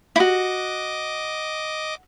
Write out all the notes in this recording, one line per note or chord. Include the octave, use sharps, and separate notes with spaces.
E4 F#4 D#5 D6